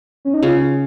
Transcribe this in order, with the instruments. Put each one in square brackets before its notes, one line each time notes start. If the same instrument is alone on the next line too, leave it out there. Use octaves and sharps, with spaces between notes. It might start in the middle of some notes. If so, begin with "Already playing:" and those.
[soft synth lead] C#4
D#4
[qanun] C#3 [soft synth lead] F4